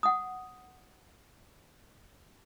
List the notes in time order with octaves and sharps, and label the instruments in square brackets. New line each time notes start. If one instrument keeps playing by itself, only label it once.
[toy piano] F#5 D#6